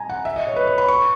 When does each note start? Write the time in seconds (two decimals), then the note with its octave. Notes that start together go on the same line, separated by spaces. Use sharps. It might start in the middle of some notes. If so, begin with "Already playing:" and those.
Already playing: G#5 A#5
0.10 F#5
0.25 E5
0.36 D#5
0.47 C#5
0.56 B4
0.67 C#5
0.78 B5
0.88 C#6